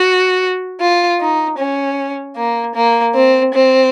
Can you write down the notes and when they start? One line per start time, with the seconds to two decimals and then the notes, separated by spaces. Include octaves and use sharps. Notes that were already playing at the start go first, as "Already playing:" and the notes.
Already playing: F#4
0.81 F4
1.20 D#4
1.58 C#4
2.37 A#3
2.75 A#3
3.15 C4
3.54 C4